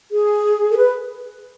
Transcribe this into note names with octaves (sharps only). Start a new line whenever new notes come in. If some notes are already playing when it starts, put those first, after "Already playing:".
G#4
A4
B4